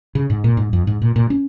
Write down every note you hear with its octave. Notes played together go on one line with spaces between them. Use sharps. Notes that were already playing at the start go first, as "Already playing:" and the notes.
C#3
G#2
A#2
G#2
F2
G#2
A#2
A#2
C#4